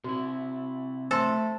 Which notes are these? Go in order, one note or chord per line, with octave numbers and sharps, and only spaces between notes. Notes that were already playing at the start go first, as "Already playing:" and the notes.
C3 E4 F#4
A3 A4 C5 C6